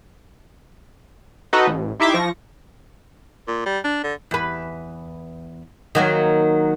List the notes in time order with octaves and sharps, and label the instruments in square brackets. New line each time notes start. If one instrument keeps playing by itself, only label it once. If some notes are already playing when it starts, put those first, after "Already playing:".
[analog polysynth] D#4 F#4 A4 B4 D#5
A1
D#4 E4 G4 E5 C6 D6
F3 C#6 A#6
[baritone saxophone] A#2
G3
D4
D3
[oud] E2 B4
D#3 F#3 A#3